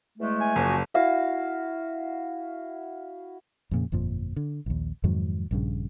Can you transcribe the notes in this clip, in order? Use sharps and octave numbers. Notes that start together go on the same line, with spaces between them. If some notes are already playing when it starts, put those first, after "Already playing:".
E2 G#3 A3
G#5
F#1 F3 F#4
E4 F#4 F5
F2 A#2 C#3
G1 F2 A#2 F3
D3
A#1 D#2
F2 G#2 D#3 F#3
A#1 G2 C#3